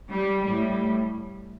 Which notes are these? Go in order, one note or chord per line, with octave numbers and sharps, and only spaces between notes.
G3
A2 G3